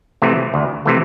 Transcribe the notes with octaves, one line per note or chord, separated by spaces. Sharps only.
C3 E3 A3
D2
C3 E3 A3